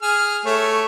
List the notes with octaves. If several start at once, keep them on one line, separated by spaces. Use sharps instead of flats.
G#4 F6
A3 C#5 E5